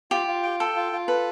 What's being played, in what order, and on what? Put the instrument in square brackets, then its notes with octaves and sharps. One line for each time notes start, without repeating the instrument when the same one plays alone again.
[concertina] F4 [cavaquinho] G4
[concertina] F4
G5
[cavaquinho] A4 [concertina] G5
[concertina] F4
F4
[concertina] A4 [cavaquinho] B4